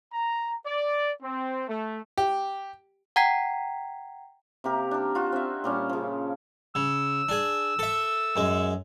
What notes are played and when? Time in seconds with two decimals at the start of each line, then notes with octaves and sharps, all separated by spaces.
0.13 A#5
0.66 D5
1.23 C4
1.69 A3
2.18 G4
3.16 F#5 G5 A#5 G#6 B6 C7
4.64 C3 A#3 G4 A#4
4.91 D4 A#4
5.15 F4 F#4
5.32 C4 E5
5.64 A#2 G3 C#4
5.89 C#3 F3
6.75 C#3 E6
7.29 D4 G#4
7.79 A4 E5
8.36 F#2 G#3